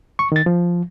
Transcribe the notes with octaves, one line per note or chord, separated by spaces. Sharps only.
C#6
D#3 A6
F3